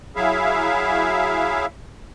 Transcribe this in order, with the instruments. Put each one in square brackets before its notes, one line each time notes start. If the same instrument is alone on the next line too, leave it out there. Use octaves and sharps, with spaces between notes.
[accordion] F#3 E4 G#4 E5 F5